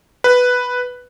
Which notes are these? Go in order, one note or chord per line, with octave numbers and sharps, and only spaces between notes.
B4